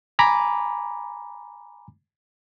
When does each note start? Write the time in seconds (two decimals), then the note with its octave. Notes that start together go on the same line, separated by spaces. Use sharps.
0.19 G#5 A#5 B5 D6